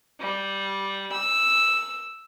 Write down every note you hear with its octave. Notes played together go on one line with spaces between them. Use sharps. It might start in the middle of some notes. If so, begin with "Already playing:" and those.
G3
E6